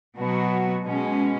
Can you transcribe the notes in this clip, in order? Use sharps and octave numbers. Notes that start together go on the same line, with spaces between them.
B2 F#3 B3 F#4
B2 G#3 C#4